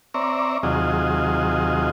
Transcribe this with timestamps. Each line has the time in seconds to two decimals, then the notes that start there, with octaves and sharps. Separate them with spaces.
0.14 C4 C#5 D5 E5 A#5
0.63 D#2 C3 F#3 F4 G#4 D#5